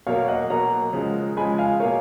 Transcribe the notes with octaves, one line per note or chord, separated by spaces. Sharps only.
B2 F#3 A#3 C#5 F5
D#5 F#5
B2 F#3 A#3 F#5 A#5
C#3 F3 G#3
C#3 F3 G#3 G#5 B5
F5 G#5
B2 A#3 C#5 F5